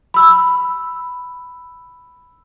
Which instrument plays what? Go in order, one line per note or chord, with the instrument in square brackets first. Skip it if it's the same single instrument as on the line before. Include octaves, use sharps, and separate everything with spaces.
[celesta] B5 E6